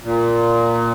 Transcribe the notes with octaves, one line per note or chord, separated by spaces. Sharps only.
A#2